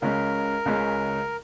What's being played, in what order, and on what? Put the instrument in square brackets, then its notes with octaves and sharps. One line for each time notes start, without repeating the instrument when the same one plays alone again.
[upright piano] C#2 C#3 G#3 C#4 [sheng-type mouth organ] A#4
[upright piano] C#2 C#3 G#3 C#4